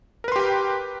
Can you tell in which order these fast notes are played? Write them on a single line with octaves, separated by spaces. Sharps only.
A#4 B4 C6 G4 G5